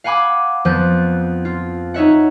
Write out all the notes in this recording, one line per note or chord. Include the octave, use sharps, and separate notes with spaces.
F5 F#5 G#5 B5 D6
F2 F3 B3 F#6 G6
F4
D#4 C#5 E5 F#5